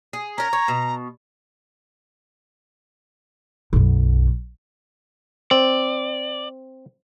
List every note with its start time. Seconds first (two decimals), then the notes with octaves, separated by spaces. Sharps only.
0.13 G#4
0.38 C#4 A#4 A#5
0.53 C#5
0.68 B2
3.73 B1 F#2
5.51 C4 D5